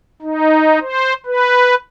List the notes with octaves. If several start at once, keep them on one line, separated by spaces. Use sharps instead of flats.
D#4
C5
B4